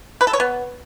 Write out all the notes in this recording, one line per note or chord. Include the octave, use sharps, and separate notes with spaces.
B4
A4
C#5
B3